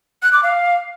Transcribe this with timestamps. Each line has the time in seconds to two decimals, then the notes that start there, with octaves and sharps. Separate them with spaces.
0.23 F#6
0.33 D6
0.43 F5